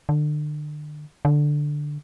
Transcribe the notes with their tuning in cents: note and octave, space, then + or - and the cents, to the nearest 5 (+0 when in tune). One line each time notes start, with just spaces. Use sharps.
D3 +35
D3 +5